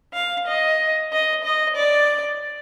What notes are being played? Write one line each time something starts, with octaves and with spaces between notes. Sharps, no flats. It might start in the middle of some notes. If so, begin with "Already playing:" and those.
F5
D#5
D#5
D#5
D5